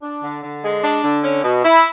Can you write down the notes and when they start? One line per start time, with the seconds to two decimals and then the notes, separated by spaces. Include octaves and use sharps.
0.02 D4
0.22 D3
0.43 D3
0.63 G#3
0.83 D4
1.04 D3
1.24 C#4
1.44 B2
1.64 E4